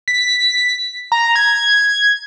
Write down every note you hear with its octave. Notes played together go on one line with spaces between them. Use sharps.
B6
A#5
G#6